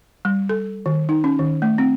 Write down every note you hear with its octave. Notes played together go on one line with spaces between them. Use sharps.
G3
A4
D#3
D#4
C#4
D#3
A3
C4